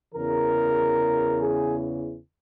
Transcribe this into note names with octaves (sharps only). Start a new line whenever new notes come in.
E2 C#3 E3 A#4
G#4